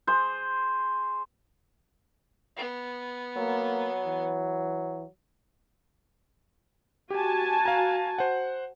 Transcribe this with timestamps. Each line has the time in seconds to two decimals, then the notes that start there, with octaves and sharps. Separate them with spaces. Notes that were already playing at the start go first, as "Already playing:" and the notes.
0.07 G#4 C5
2.57 B3
3.36 F#3 A#3
4.05 E3
7.10 F#4 G4 G#5 A5
7.66 F5 A#5
8.18 C5 F#5